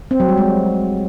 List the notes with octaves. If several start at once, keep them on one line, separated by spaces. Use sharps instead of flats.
C4
F#3
G3
G#3